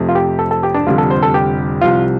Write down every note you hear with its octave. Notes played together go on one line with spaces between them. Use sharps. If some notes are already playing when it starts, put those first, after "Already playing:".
Already playing: F2 C3 A3
F4
G4
A4
A4
G4
D4
F1 F2 D3 G3 F4
A4
C5
A4
G4
C2 C3 F3 F4